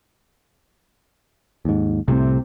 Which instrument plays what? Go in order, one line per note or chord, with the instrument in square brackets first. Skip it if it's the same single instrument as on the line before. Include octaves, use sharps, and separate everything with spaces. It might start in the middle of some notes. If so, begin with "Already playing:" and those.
[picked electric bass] D#2 G#2
[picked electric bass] C2 A2 [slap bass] C3 C4